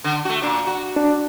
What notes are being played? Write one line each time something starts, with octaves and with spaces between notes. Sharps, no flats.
D3
A3 F#4
A#2 D4
F#4
D4